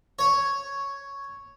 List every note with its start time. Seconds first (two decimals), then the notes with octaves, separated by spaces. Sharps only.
0.19 C#5